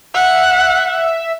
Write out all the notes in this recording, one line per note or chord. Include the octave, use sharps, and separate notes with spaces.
E5 F#5